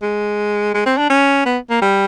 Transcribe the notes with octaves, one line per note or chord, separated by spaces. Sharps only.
G#3
G#3
C4
D4
C#4
B3
A#3
G3